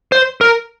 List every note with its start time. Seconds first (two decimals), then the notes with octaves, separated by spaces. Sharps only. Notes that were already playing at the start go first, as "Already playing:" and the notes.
0.12 C5
0.41 A#4